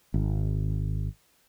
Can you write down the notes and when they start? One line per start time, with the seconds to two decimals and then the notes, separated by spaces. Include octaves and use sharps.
0.14 G#1